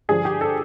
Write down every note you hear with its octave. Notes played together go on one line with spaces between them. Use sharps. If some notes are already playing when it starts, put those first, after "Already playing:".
G2 D3 F3 G#4
G4
A4